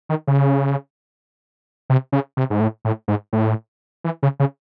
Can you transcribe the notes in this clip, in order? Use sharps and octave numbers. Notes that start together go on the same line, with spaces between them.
D#3
C#3
C3
C#3
C3
G#2
A2
A2
G#2
A2
E3
C#3
C#3